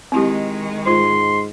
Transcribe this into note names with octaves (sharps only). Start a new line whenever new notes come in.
D#3 G#3 C4 E4 G4
G#2 F4 C5 C6